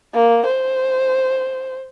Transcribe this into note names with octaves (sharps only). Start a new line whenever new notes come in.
A#3
C5